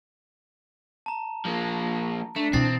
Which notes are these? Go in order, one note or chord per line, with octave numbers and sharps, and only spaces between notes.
A5 A#5
F3 A#3
A3 D4 E7
B2 E3 C4 D#6 A6 C7